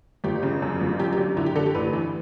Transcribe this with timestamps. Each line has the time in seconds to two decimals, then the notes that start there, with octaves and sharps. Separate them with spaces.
0.24 G1 G4
0.43 C#3
0.62 F#2
0.81 G1
1.00 F#2 G4
1.13 G4
1.18 D3
1.37 D3 E4
1.46 G4
1.55 D3 A4
1.66 G4
1.75 A1 B4
1.93 E3